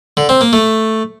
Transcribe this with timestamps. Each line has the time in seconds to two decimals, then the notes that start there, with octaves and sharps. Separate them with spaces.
0.17 D3
0.29 C4
0.41 A#3
0.53 A3